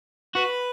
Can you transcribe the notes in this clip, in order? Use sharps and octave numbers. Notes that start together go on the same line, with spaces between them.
F#4 B4